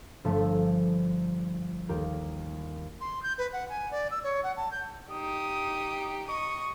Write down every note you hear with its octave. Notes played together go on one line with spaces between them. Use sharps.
G1 F3 A3 A4 E5 A5
D#2 G4 A#4
C6
G6
B4
F#5
G#5
D5
E6
C#5
F#5
A5
G6
D#4 G4 D#6
D#5 C#6 D#6